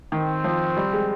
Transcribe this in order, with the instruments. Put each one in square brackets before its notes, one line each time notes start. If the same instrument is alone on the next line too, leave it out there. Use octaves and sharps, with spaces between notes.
[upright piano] D#3 [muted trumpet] C4
[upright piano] F3
G3
G#3